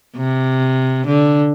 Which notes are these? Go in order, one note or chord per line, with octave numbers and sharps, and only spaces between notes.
C3
D3